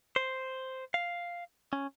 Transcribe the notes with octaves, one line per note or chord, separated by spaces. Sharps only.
C5
F5
C#4